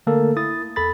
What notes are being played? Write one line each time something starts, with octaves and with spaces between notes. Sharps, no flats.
D3 A3 A#3 A4 A#4
E4 D#6 A6
E2 A4 B5 A6